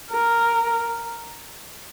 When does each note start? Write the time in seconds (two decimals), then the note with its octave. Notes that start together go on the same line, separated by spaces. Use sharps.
0.12 A#4